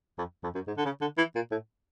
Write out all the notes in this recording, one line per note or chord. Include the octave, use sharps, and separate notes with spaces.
F2
F2
F#2
G#2
D3
C#3
D3
E3
A#2
A2